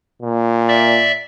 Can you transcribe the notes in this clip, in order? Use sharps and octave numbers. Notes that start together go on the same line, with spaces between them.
A#2
D5 E5